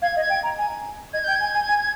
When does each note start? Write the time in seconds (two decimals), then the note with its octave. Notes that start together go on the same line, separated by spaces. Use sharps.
0.02 F5 G#6
0.16 D#5
0.20 G#6
0.29 G5
0.43 A#5
0.58 G#5
1.13 D#5 G#6
1.24 G5 G6
1.36 G#5 G#6
1.54 G#5
1.68 G#5